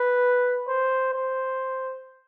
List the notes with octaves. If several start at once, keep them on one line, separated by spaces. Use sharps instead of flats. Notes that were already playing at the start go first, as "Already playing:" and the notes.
Already playing: B4
C5
C5